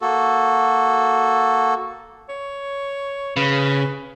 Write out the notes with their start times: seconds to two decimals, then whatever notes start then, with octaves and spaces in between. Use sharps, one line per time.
0.02 A#3 F#4 A4
2.29 C#5
3.36 C#3 B4